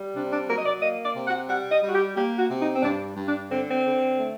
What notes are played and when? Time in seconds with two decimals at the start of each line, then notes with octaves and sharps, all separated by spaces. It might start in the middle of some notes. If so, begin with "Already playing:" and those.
Already playing: G3
0.14 C3 D4
0.31 D4
0.47 F#3 A#4
0.57 D#5
0.65 D5
0.81 A#3 D#5
1.04 D5
1.15 C3
1.26 F#5
1.48 G3 F#5
1.70 D#5
1.82 G3
1.89 F#4
1.93 G4
2.16 A#3 G4
2.38 F#4
2.49 C3
2.60 D#4
2.73 C4
2.82 G2 D4
3.16 G2
3.26 D4
3.50 D3 C4
3.69 C4
3.83 D3
4.17 A3